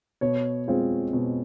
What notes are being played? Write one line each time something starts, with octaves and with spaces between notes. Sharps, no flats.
B2 C#5
G#3 C4 F4
B2